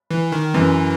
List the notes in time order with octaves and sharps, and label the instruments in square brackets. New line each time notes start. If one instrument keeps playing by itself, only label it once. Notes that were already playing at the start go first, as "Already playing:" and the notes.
[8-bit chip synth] E3
D#3
[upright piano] F#2 [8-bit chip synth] E3